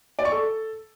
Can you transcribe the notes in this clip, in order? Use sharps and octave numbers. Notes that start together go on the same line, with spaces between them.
D5
C#6
A4